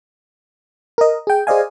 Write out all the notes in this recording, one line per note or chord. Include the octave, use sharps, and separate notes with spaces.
A#4 D#5
G#4 G5
G#4 C5 D5 D#5 F5 G#5